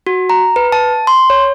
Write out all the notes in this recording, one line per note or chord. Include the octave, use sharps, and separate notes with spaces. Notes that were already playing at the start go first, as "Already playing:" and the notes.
F#4
A#5
B4
A5
C6
C#5